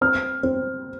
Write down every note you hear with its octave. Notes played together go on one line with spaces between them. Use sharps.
C4 F6
C4